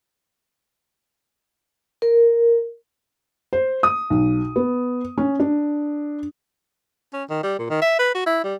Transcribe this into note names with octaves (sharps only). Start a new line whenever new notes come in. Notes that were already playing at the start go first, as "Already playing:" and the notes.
A#4
C5
D#6
B1
B3
C#4
D4
C#4
D#3
G3
A#2
D#3
E5
B4
F#4
E4
G3